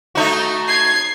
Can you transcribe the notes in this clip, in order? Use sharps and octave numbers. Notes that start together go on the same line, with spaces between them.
A3 D#4 F#4
G#6 C7